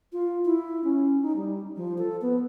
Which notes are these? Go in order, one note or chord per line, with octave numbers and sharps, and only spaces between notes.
F4
E4
C#4
D#4
G3
F3
A4
B3